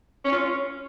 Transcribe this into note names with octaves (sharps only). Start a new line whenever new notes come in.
C#4
F4
C#4